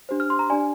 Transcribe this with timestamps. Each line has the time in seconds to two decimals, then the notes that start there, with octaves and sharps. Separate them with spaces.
0.09 D4 G4 C5
0.20 F6
0.30 C6
0.39 A#5
0.50 D4 G4 D5 G#5